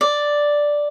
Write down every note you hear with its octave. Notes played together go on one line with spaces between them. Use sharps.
D5